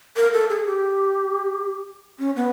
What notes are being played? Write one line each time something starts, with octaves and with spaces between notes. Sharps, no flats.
A#4
A4
G#4
G4
C#4
B3